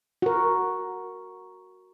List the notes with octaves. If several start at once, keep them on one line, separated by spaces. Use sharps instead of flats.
F#4 A#4